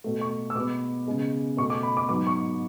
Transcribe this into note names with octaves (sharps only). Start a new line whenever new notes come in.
B2 A3
C#6
E6
B2 G#3 B3 D6
C#3 G#3 B3
B2 A3 C#6
D6
B5
D6
G#2 F#3 B3 D6
C#6